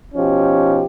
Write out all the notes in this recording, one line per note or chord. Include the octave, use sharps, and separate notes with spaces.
B2 F3 C#4 D#4 G4